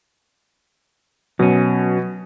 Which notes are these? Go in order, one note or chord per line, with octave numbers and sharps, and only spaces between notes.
B2 F#3 C#4